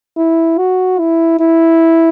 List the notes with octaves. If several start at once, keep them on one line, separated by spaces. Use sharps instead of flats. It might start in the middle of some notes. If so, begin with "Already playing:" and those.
E4
F#4
E4
E4